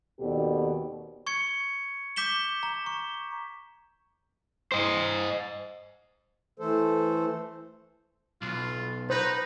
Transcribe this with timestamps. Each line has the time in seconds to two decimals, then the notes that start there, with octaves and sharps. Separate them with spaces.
0.19 D#2 B2 C4 G4 A4 D5
1.27 C#6 G#6 C#7
2.16 D6 G6 B6 E7 G7
2.63 A#5
2.86 C#6
4.72 C5 D#5
6.59 E3 A3 A4 C5
8.42 B1 F4
9.10 D#4 B4 C5 A#5